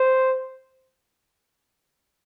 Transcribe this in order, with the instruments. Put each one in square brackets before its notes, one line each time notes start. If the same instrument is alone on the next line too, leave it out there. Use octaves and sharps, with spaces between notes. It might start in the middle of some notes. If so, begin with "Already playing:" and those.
Already playing: [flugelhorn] C5